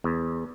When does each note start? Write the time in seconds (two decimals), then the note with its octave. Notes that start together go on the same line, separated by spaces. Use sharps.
0.04 E2